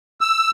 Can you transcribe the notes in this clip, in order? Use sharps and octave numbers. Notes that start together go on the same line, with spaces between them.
E6